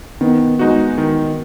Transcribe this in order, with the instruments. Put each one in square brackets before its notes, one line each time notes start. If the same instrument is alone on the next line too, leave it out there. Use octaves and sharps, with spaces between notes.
[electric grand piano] D#3 [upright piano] B3
[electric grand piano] G#3 D#4 F#4
D#3